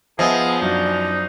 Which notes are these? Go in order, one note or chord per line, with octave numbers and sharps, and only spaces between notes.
F3 B3 G#4 D#5 E5 G#5
F#2 D4 D#4